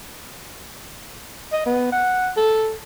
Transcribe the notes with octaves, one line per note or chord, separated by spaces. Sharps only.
D#5
B3
F#5
A4